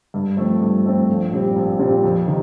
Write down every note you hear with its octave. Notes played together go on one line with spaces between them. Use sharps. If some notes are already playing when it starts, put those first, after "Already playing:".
G2
F3 A3 C4
G2
F3 A3 C4
A#1
A#2 G3 C4
A#1
A#2 G3 C4
F2
C3 D#3